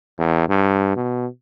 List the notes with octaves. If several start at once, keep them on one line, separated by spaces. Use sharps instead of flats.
E2
G2
B2